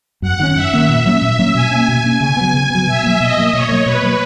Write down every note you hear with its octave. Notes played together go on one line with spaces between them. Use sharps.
F#2 F#5
D#3 A#3 C#4
F#2 E5
D#3 A#3 C#4
A#2
F#3 A#3 C#4
A#2
F#3 A#3 C#4
B2 G#5
A#3 C#4
B2
A#3 C#4
C#3 G#5
F#3 B3
C#3 G#5
F#3 B3
B2 E5
F#3 A#3
B2 D#5
F#3 A#3
B2 C#5
F#3 A#3
B2 B4
F#3 A#3